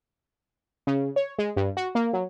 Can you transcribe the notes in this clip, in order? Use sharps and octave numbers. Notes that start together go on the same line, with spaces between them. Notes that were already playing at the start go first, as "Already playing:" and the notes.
C#3
C#5
G#3
G2
F#4
A#3
F#3